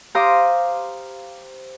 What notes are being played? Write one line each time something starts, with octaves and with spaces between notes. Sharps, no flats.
G4 C5 F5 A#5 D6 D#6